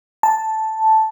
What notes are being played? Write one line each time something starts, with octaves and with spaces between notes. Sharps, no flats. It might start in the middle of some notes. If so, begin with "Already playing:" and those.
A5